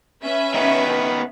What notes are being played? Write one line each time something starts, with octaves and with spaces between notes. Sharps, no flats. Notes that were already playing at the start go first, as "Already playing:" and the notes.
C#4 B4 E5
D#3 B3